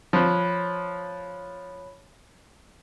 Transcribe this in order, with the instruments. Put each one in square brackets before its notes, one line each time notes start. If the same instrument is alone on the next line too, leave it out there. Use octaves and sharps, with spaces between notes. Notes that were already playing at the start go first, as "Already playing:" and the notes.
[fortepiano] F3 [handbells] C#5 B5 F#6